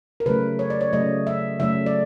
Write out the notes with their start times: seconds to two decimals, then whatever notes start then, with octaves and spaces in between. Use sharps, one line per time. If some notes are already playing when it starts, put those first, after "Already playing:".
0.20 A#4
0.26 C#3 F#3 A3 B4
0.59 C#5
0.70 D5
0.81 C#5
0.92 C#3 F#3 A3 D#5
1.27 E5
1.59 C#3 F#3 A3 E5
1.86 D5